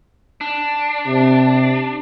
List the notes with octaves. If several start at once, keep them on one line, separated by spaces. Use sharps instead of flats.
D4
C3